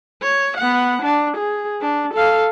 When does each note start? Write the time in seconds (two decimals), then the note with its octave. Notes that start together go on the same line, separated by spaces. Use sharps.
0.23 C#5
0.57 B3 F#5
1.02 D4
1.37 G#4
1.81 D4
2.14 A4 F5